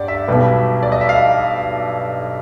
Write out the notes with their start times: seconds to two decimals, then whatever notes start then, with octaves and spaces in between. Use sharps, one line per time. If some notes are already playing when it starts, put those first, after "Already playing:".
Already playing: G2 D5 F#5
0.08 E5
0.28 B1 B2 G3 B3
0.83 D5
0.92 D#5
1.01 E5
1.09 F5